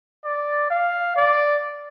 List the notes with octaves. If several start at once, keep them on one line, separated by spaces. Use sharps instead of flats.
D5
F5
D5